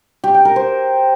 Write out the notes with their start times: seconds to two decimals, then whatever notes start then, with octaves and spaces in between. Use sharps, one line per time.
0.24 G4
0.34 G5
0.45 A#4
0.56 C5